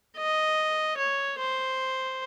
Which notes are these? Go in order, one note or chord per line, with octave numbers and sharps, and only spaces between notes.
D#5
C#5
C5